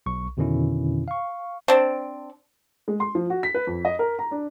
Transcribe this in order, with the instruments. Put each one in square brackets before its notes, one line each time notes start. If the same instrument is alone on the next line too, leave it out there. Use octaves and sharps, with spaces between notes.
[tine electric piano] B1 C#6
F2 B2 D3 D#3 C#4 E4
F5 C#6
[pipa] C4 D4
[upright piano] G#3
C6
F3
F#4
B6
B4
F2
D#5
A#4
A#5
D4